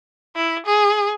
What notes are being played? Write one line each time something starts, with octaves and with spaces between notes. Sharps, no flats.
E4
G#4